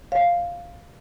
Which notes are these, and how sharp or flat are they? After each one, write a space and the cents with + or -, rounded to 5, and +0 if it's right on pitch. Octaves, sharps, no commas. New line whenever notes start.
C#5 +0 F5 +0